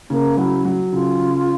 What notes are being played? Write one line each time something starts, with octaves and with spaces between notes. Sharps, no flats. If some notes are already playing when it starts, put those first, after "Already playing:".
C#3 A#3
F#3 E4
F#3
C#3 F4
C#3